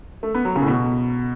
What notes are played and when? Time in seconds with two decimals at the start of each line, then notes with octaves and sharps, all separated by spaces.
0.23 A3
0.35 B3
0.45 F#3
0.56 C#3
0.62 A2
0.68 B2